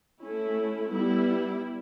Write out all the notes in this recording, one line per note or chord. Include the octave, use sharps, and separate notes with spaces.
A3 C#4 E4
G3 B3 E4